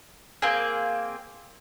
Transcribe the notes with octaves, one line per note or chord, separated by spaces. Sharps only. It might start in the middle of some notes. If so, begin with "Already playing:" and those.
A#3 C4 G#4